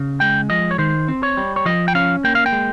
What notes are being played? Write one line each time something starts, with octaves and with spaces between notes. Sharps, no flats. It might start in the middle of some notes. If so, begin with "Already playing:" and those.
Already playing: C#3
G#3 G5
F3 D#5
C#5
D#3 C5
C4
C#5
G3
C#5
F3 D#5
G5
C#4 F5
A#3 G5
F5
G5
G#3